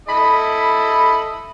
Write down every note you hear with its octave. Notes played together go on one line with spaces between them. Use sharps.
E4 A4 D#5 B5